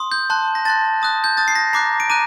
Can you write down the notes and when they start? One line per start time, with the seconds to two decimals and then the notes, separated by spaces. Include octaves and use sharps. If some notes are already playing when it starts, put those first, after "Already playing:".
Already playing: C6 D#6
0.11 G6
0.30 A5 C6 F#6
0.55 A#6
0.65 A5 C6 F#6 A6
1.02 A5 D#6 F#6
1.24 G6
1.37 A5 D#6 F#6 A6
1.48 C7
1.55 A#6
1.73 A#5 D6 F#6 C7
2.00 D7
2.10 A#5 D6 F#6 D#7